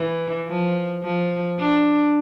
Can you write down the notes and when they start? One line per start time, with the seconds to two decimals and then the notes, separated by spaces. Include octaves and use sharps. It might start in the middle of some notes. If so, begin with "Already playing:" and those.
Already playing: E3
0.48 F3
1.04 F3
1.59 D4